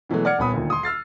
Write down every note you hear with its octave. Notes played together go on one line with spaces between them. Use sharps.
B2 E3 F#3 G#3 A3
D5 F#5 D6 F6 G#6 C#7
D#1 B3 B5 D#6
D2 A#2 D#3
C6 D#6
E6 F6 A6 C7